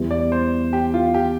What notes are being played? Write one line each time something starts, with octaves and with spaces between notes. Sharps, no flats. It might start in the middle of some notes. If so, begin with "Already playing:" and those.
Already playing: E2 E3 G3
D5
C5
G4
F4
G4